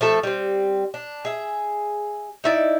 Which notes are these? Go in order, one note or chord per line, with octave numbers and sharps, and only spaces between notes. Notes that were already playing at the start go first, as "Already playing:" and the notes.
F3 A3 A4
G3 C4
D4
G#4 E5
D#4 E4 D5